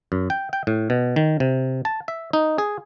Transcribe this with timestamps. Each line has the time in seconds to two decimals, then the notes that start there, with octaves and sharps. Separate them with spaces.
0.12 F#2
0.30 G5
0.53 G5
0.67 A2
0.90 B2
1.16 D#3
1.40 C3
1.85 A5
2.08 E5
2.33 D#4
2.58 G#4